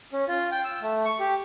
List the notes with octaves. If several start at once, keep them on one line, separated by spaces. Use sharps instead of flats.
C#4
F4
G5
E6
A3
C#6
G4